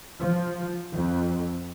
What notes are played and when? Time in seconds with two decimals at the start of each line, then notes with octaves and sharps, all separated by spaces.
0.19 F3
0.92 F2